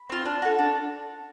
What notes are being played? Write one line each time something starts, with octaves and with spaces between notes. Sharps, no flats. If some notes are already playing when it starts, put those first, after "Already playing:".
Already playing: B5
C4 F4
D4
F#4 A4
D4